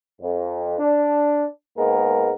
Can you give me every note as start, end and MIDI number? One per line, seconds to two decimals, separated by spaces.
0.20 0.79 41
0.79 1.45 62
1.76 2.30 44
1.76 2.30 56
1.76 2.30 58
1.76 2.30 59
1.76 2.30 70